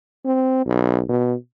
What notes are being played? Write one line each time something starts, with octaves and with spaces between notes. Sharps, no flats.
C4
B1
B2